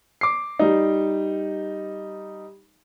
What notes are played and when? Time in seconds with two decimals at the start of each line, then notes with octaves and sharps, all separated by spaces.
0.21 D6 C7
0.59 G3 D#4